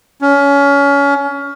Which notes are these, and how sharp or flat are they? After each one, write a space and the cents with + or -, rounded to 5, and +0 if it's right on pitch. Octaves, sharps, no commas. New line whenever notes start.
C#4 +25